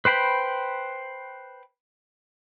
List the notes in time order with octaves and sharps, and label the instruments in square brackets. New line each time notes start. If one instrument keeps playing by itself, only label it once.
[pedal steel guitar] B4 C5 G5 B5